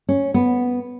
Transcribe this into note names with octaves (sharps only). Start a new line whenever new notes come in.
C#4
B3